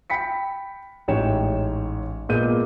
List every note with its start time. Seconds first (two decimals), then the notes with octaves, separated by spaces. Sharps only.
0.10 G5 B5 B6 C#7
1.08 A1 G#2 C#5 G5 E7
2.29 A#2 G#3 B3 G6 D#7